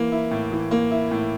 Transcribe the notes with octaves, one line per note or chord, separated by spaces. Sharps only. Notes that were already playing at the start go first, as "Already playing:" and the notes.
Already playing: E3 A#3
E4
A2
E3
A#3
E4
A2